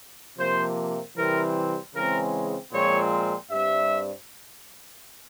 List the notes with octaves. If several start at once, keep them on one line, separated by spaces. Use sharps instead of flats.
C3 F3 A#3 C5
C3 E3 G3 C4 A#4
C#3 E3 G#3 C4 A#4
A#2 F3 G#3 C4 C#5
G2 G3 C4 E5